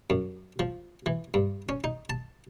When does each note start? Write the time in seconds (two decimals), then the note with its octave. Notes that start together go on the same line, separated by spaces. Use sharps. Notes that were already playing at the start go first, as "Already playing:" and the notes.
0.10 F#2
0.59 F3
1.06 E3
1.34 G2
1.69 C#4
1.84 D#4
2.10 A5